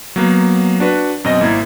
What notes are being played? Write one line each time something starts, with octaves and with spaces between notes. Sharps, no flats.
F#3 A#3 B3
D4 F#4 B4
F#2 B2 C4 D#5 A#6
G#1 A#3 E4 A#5 G#6